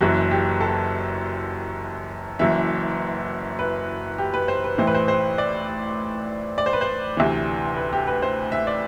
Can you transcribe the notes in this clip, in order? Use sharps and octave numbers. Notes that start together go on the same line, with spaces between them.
F#1 F#2 E3 F#4
G4
A4
F#1 F#2 E3 E5
B4
G4
B4
C5
B4
A1 A2 E3 C5
B4
C5
C5
D5
D5
C5
B4
C5
D2 C3 E3
B4
G4
B4
C5
E5
D5